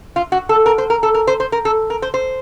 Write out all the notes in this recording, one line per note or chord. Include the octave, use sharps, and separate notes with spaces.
F4
F#4
A4
A#4
C5
A#4
A4
A#4
C5
C5
A#4
A4
A#4
C5
C5